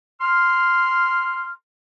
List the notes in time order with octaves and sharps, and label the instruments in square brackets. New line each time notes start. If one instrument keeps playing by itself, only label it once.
[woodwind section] C6 F6